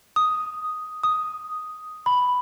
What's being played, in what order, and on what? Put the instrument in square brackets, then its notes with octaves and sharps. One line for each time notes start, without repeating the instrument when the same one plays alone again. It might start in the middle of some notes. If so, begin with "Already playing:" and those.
[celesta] D#6
D#6
B5